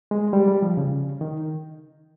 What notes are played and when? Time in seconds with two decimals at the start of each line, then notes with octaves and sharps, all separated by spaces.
0.11 G#3
0.33 G3
0.48 G3
0.62 F3
0.77 C#3
1.21 D#3